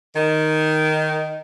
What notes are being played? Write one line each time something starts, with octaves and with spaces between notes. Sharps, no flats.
D#3